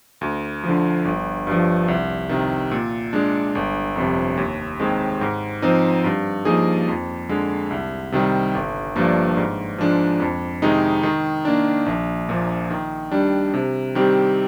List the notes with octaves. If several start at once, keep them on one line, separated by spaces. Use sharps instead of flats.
D2
D3 F3
G1
G2 F3
C2
C3 D#3
A#2
G#3 D4
G1
F2 C3
D#2
D#3 G#3 C4
G#2
F3 C4 D#4
G2
F3 A#3 D#4 G#4
F2
D3 G#3
C2
C3 D#3 G3
G1
G2 F3 A#3 D4
G#2
F3 G#3 D4
F2
C3 D#3 G#3 D#4
D#3
A#3 D4
A#1
A#2 F3 A#3
D#3
G3 D4
C3
D#3 G3 C4 G4